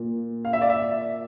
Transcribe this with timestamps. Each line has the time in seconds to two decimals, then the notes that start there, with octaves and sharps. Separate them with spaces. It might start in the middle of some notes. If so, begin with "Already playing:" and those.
Already playing: A#2
0.45 F5
0.53 E5
0.62 D5
0.70 E5